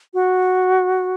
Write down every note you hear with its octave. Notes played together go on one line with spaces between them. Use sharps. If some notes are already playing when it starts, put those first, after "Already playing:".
F#4